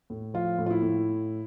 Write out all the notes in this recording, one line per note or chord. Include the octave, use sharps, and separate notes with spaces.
A2
F3 F4
A2
F4
E4
A2